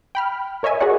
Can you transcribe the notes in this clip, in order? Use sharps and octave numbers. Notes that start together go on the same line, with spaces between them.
G5 B5 F6
A#4 C#5 D#5 E5 G#5
F#4 G#4 A#4 C#5 D5 F#5